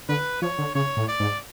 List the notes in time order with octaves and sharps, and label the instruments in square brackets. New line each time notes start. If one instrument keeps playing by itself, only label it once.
[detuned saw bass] D3 [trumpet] B4
[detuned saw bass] F3 [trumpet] C#5
[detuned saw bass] D3
[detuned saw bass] C#3 [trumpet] C#5
[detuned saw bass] A2
[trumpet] D5
[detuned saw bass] G#2